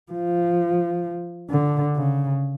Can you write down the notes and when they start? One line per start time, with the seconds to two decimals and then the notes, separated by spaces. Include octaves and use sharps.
0.12 F3
1.51 D3
1.96 C#3